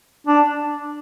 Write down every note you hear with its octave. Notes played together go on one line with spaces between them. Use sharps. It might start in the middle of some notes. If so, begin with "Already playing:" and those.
D4